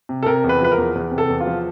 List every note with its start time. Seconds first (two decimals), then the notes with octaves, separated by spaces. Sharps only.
0.09 C3
0.23 A4
0.26 C3 A#4
0.44 E2
0.49 B4
0.61 F3 B4
0.72 A#4
0.78 E2
0.95 E2
1.11 C3
1.18 A4
1.29 E2
1.40 F4
1.46 F3